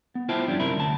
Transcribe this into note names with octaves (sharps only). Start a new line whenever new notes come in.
B3
E4 F4 C5 E5 G5 A5
G2 F3 G3 C#4 D4
F#2 C3 A#4 E5 B5
D2 A5